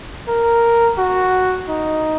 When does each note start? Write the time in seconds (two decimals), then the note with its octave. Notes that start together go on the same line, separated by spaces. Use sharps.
0.28 A#4
0.98 F#4
1.68 D#4